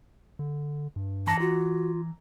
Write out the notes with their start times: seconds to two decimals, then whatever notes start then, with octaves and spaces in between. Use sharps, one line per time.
0.39 D3
0.96 G2
1.27 E3 A5 A#5
1.40 F4 F#4